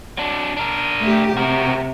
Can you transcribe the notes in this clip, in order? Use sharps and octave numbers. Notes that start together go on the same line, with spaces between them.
F#3 D4
D4 A#4
A3 G4
C3 F#4 A#4